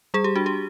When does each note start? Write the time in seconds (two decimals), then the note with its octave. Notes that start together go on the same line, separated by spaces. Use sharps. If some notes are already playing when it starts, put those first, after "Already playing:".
0.14 G3 G#4
0.24 G4
0.36 D4 F#4
0.46 G4